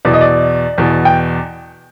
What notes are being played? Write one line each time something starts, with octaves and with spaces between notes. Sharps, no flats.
E2 B2 D5
D#5
D5
E2 B2
G5